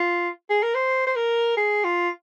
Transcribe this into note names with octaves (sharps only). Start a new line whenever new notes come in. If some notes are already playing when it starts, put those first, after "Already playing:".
Already playing: F4
G#4
A#4
C5
C5
A#4
G#4
F4